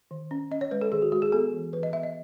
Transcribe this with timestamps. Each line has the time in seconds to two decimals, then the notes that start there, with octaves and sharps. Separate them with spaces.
0.11 D#3
0.31 C#4
0.51 C#4 D#5
0.61 C#5
0.71 G#3 B4
0.81 A4
0.92 D#3 G#4
1.02 F#4
1.12 G#3 F#4
1.22 G#4
1.32 B3 A4
1.53 E3
1.73 E3 B4
1.83 D#5
1.93 B3 E5
2.03 D#5